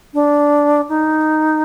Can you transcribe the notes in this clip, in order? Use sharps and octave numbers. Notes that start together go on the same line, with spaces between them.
D4
D#4